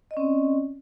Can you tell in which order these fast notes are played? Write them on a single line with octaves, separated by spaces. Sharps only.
D#5 D5 C#4 C4